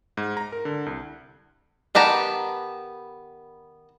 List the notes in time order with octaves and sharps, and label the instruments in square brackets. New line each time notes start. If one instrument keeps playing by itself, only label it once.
[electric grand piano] G#2
A#5
A#4
D3
C2
[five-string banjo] D#3 B3 G4 A5 A#5